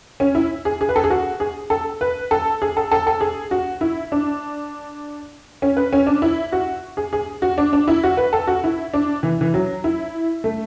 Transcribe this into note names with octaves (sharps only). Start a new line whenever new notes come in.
C#4
E4
G#4
G#4
B4
A4
G#4
F#4
G#4
A4
B4
A4
G#4
A4
A4
A4
G#4
F#4
E4
D4
C#4
B4
C#4
D4
E4
F#4
G#4
G#4
F#4
D4
D4
E4
F#4
B4
A4
F#4
E4
D4
E3
E3
F#3
E4
A3